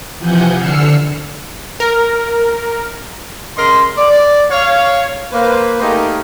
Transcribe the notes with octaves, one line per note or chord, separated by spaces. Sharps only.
C3 E3 F3 F#5 G#5 G6
D3 E6 F6 C7 C#7
A#4
C#3 A#4 D#5 C6
D5
C#5 F5
A#3 B4 C5
A3 A#3 D#4 G4 G#4 A#4